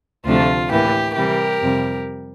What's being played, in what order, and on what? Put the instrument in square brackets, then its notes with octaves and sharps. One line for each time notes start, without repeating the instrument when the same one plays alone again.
[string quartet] D2 C3 F3 A3 D4 F4
A2 E3 A#3 G4
C3 E3 G3 G4 A#4
F2 C3 G3